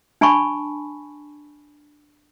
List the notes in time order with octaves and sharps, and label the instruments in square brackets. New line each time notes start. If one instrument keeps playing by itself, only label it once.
[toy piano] D4 G#5 A5 B5 C#6